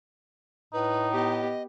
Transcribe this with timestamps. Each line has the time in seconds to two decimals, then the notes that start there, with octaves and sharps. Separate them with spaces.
0.73 A2 D#4 B4
1.13 B3 G4 D#5